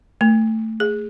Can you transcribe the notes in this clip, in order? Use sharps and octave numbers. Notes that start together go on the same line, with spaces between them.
A3
G#4